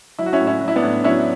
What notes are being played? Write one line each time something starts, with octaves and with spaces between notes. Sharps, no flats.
F#3 E4
F#4
C#4 E4
A2
C#4 E4
F#3
E4
B3 D4
A2
F#3 C#4 E4